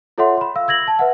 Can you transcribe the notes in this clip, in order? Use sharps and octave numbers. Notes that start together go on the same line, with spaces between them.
F4 A4 C#5 E5 F#5 C6
B5 C6
F5 E6
E6 G#6 A#6 F#7
A5
B4 E5 F#5